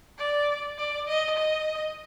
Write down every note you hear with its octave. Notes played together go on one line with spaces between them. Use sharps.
D5
D5
D#5
D#5